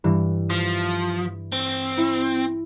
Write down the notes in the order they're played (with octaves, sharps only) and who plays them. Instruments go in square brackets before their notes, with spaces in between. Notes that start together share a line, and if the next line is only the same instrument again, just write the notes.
[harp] G2 E3
[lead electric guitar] F3
C4
[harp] E4 C#7